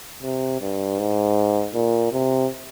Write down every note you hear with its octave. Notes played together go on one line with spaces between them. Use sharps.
C3
G2
G#2
A#2
C3